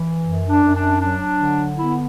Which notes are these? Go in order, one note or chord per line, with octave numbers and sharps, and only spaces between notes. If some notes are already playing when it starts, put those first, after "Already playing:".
Already playing: E3
F#2
D4
F#2
D4
F#3 D4
D3
B3 E4